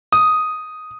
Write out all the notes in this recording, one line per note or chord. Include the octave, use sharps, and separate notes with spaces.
D#6